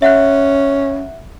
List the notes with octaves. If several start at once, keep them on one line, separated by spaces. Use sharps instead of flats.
C#4 E5 F#5 F#6